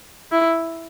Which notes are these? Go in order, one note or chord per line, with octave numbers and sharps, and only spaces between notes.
E4